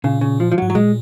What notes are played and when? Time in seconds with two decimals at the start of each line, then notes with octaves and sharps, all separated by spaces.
0.04 A#2 C#3
0.21 C#3
0.40 F3
0.52 F3
0.58 F#3
0.62 G#2
0.70 F#3
0.75 A#2 G#3